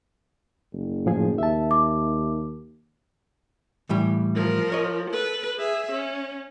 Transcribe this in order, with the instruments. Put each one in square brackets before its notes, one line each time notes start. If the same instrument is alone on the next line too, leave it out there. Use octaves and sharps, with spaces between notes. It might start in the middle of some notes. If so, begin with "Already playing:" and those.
[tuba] F#1
[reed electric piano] A2 F3 G#4
[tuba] D#2 [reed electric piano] E5 A5
[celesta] D6
[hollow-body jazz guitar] A2 E3 G3
[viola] F3 A#4
[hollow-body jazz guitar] C#5 D#5
[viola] A4 B4
G#4 E5
C#4